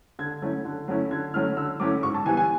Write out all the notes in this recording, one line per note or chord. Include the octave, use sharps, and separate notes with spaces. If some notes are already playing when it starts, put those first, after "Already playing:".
D3 G#6
F#3 A3 C#4 E4
D3
F#3 A3 C#4 E4
D3 G#6
F#3 A3 C#4 E4 F6
D3 E6
F#3 A3 C#4 E4 D6
G#2 C#6
A5
E3 G3 B3 G#5
G#5